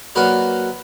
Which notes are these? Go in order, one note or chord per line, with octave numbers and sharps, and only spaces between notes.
F#3 A#3 F#4 A#4 B4 D5